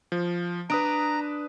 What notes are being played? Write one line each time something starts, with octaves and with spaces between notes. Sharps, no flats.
F3
D4 B4 A#5 D#6 D7